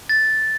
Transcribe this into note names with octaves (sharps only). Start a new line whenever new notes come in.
A6